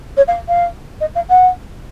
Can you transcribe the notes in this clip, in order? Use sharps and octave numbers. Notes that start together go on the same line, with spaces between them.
C#5
F5
F5
D#5
F5
F#5